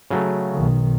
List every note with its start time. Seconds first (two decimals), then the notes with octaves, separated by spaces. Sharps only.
0.11 C#3 F#3 A3
0.53 B1 D#3